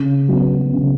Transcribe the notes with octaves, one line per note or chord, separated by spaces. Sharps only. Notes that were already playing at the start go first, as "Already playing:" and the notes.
Already playing: C#3
F#3 B3
C#3